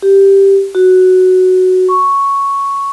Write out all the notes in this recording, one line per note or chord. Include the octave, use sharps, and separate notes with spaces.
G4
F#4
C#6